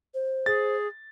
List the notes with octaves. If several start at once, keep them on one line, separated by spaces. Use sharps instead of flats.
C5
G#4 A6